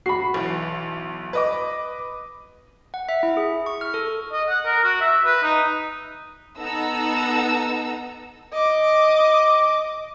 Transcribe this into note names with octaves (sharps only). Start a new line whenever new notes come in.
F#4 B5 C7
B1 E3
B4 D#5 D6
F#5
E5
E4
G#4
C#6
F6
A4
D#5
F#5
A#4
F#4
E5
B4
D#4
B3 D#4 A4 F#5 A#5 E6
D#5 D6